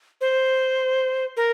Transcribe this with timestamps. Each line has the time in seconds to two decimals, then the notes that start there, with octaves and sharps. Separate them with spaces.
0.21 C5
1.37 A#4